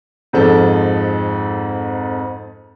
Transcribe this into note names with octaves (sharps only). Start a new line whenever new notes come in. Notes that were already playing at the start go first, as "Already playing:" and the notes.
F2 G#2 F3 A4